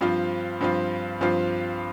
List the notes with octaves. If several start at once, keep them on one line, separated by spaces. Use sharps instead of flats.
G2 F3 C4 F4
G2 F3 C4 F4
G2 F3 C4 F4